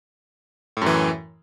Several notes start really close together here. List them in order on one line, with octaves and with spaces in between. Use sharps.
A2 F#2 E3